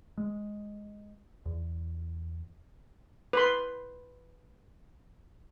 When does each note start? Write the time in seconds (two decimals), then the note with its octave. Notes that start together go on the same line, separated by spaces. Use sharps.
0.18 G#3
1.45 E2
3.33 B4 C6